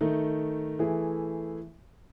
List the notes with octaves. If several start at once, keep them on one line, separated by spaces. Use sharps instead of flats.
D#3 A3 D#4
E3 A3 E4 G#4